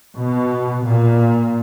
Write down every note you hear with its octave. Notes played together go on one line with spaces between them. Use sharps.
B2
A#2